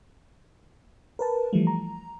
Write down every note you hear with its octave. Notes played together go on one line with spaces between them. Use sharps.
A#4 B4 A5
E3 F3 G3 A3
A#5